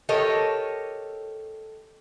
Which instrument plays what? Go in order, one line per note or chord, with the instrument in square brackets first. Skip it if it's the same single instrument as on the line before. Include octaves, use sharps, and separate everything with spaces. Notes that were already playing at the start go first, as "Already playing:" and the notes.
[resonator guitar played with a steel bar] G4 A4 A#4 C#5 D#5